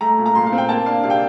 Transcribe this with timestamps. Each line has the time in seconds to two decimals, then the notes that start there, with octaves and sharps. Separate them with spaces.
0.01 A3 A#5
0.18 A#2
0.26 A#5
0.35 A#2 C6
0.46 F5
0.52 C4
0.58 G5
0.69 A#3 A5
0.86 D4 F5
1.03 C3 F5
1.10 G5